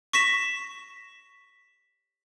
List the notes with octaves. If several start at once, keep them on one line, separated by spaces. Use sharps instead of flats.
C#6 A#6 B6 E7